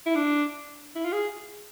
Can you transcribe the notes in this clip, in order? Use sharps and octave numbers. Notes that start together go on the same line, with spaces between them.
E4
D4
E4
F4
G#4